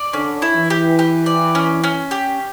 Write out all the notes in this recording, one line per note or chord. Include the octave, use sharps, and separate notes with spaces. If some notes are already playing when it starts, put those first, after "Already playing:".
Already playing: D5
D3 C#4
E4
E3
G4
G4
D5
C#4
C#4
G4